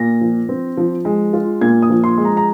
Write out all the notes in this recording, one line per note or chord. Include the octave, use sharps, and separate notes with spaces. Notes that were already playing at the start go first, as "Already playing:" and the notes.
Already playing: A#2 A#6
F3
C4
F3
G#3
F4
A#2 G#6
D#6
F3
C6
G#3
A#5
A#5